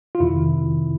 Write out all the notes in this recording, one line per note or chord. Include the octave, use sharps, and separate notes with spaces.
F4
F2 C3 D#3 E4